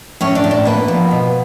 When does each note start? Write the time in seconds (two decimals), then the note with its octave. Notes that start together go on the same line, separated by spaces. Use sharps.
0.21 A2 C#4 C#5
0.35 D4 D5
0.44 A2
0.51 D4 D5
0.65 A#3 B3 B4
0.88 F3
1.11 B2